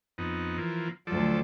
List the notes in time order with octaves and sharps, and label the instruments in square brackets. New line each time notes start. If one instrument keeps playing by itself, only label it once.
[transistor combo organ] F2 B3 D#4
E3 F3 A#3
[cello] D2 F#3 [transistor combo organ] F3 A4 D5